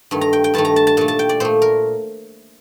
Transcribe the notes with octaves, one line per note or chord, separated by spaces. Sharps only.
G2 D#3 A3
A#5
G5
G5
G2 D#3 A3 A5
A#5
A5
A5
A#2 A3 A5
A5
G5
D5
A#2 A3 C5
A#4